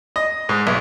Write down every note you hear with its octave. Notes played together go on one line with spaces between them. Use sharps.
D#5
G#2
B1